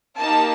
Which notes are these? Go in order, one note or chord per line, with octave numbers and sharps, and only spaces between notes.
A#3 D#4 G4 A5